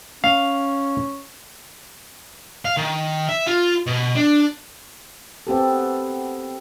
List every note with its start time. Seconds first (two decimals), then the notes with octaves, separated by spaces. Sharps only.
0.24 C#4 F5
2.65 F5
2.77 D#3
3.29 E5
3.47 F4
3.87 B2
4.15 D4
5.47 B3 C4 G4 A4